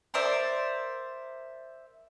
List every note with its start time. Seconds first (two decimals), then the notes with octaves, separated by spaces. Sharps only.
0.14 A#4 C5 D5 E5